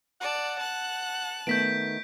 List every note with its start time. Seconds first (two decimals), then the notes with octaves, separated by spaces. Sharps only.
0.21 D5 F#5 A5
0.59 A5 F#6
1.47 D#3 A3 B3 G6 B6 D7